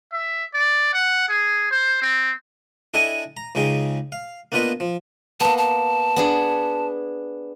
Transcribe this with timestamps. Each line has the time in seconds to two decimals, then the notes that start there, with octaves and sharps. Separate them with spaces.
0.13 E5
0.54 D5
0.93 F#5
1.28 G#4
1.71 C5
2.02 C4
2.94 D4 E4 A4 D#5 G5 G#5
3.37 A#5
3.55 C#2 C#3 D#4 G#4 G5
4.12 F5
4.52 A#3 B3 D4 F4 B4 D#5
4.80 F3
5.40 A#3 B3 A5
5.58 A5
6.16 B3 D4 G#4